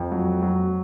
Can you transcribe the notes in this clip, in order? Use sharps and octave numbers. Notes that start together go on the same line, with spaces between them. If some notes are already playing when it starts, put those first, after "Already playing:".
Already playing: F2
F#3
F#3